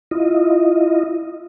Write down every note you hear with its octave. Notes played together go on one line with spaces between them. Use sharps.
E4 F4 D#5